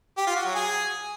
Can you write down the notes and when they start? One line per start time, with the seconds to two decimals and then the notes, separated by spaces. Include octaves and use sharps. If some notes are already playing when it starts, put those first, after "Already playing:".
0.17 G4
0.27 F4
0.36 F#4
0.45 F#3
0.55 G#4